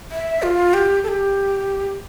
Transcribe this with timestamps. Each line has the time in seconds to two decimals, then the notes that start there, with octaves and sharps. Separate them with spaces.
0.11 E5
0.43 F4
0.74 G4
1.04 A4
1.08 G4